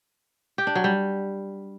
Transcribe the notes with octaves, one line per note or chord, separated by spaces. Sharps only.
G4
D4
F#3
G3